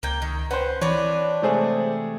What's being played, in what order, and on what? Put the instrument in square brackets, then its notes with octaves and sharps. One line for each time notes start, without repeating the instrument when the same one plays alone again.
[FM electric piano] C#2 G#6 [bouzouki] A#3 G5
[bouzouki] D#3
[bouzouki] C#4 [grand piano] B4 C5 [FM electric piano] F#5 G5
[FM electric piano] E3 [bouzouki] C4 D4 B4 [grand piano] C#5
[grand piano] C3 A3 G#4 [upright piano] G#3 C5